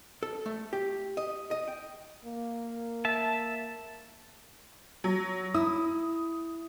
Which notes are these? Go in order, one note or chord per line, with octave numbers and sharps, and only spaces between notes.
A4
A3
G4
D#5
D#5
G5
A#3
E5 A5
F#3
E4 D#6